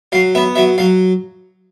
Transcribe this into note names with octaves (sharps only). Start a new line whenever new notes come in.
F#3 F5
B3 E5
F#3 E5
F#3 F5